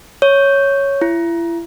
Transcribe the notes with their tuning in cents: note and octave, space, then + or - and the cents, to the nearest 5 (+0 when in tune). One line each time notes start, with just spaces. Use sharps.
C#5 +0
E4 +35